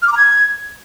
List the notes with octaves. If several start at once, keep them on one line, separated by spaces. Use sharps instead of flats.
F6
D6
A#5
G#6